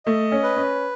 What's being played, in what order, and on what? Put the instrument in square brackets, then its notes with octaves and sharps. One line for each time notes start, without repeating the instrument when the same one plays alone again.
[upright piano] A3 [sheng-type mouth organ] D#5
[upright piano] C#4
[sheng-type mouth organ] B4
[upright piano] C#4